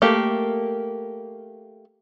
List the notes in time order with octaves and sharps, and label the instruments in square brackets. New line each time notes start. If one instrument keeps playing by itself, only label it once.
[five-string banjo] A3 A#3 G4